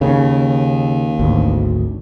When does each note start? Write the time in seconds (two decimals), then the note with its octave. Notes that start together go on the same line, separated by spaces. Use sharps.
0.01 D#2 C#3
1.19 G#1 D2